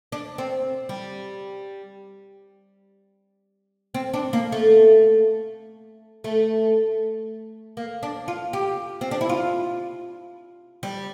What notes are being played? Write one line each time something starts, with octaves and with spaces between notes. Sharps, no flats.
D4
C4
G3
C4
D4
A#3
A3
A3
A#3
D4
F4
G4
C4
D4
E4
F4
G3